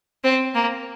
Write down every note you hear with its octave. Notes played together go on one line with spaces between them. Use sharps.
C4
A#3